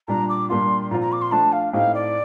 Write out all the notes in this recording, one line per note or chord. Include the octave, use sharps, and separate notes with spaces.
A#2 G3 D4 A#5
D6
A#2 G3 A#3 D4 F4 C6
A#2 F3 C4 F4 A#5
A#5
D6
C6
F3 A3 D4 A5
F5
A2 A3 C4 D#4 G4 F5
D5